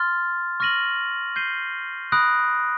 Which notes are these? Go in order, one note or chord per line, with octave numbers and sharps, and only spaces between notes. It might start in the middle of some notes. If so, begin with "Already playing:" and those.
Already playing: C6 F6 A6
C#6 F6 A#6 D#7 F#7
G6 C7 D#7 G7
B5 D#6 F#6 A#6 D7